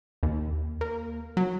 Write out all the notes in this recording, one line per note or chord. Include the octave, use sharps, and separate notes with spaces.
D#2
A#3
F#3